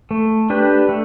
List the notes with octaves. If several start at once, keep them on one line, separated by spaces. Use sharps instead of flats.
A3
D4 G4 B4
A3